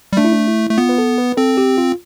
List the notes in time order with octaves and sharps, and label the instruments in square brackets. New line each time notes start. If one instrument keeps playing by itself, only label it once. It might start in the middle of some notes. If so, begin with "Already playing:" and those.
[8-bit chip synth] G3
[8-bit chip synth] A3 [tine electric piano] D4
[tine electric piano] E4
D4
E4
[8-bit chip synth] A3
[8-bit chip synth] B3 [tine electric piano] F4
[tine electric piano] B4
A4
B4
[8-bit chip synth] C4 [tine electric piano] A4
[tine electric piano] G4
F4